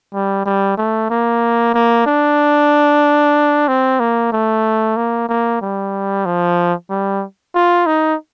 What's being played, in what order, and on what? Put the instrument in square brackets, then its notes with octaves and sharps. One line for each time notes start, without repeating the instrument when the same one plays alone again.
[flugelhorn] G3
G3
A3
A#3
A#3
D4
C4
A#3
A3
A#3
A#3
G3
F3
G3
F4
D#4